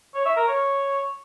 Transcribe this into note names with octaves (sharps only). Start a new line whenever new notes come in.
C#5
E5
A#4
C#5